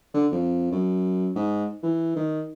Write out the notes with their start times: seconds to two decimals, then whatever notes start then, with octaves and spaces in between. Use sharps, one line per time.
0.14 D3
0.32 F2
0.71 F#2
1.35 G#2
1.83 E3
2.16 D#3